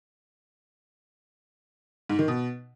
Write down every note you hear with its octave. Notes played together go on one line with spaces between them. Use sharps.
G#2
D#3
B2